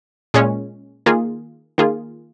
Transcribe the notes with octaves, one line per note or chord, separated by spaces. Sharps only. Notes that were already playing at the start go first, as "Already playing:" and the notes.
A#2 G#3 C#4
D#3 A#3 F4 G#4
D#3 A#3 F4 G#4